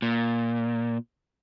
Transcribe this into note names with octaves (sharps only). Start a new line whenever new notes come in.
A#2